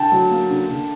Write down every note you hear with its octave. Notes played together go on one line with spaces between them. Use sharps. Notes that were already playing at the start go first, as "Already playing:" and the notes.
Already playing: D3 G5 A5
F#3
A#3
D3
D3